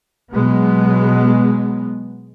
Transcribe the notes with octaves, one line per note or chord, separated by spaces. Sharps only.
B2 F#3 G#3 B3